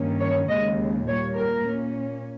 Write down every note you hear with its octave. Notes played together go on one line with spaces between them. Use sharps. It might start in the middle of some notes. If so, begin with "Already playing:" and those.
Already playing: G2 D#3 A#3 C#4
C#5
D#2 C#3 G#3 D#5
A#2 G3 A#3 C#5
A#4
A#2 A#3 C#4